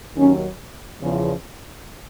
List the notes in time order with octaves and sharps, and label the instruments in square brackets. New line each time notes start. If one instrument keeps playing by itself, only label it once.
[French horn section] D#2 D#3 F#3 C#4
E2 C#3 F3